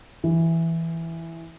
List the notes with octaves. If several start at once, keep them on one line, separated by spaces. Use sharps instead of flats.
E3